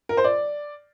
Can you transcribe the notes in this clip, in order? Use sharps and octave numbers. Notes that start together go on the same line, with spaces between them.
A#4
C5
D5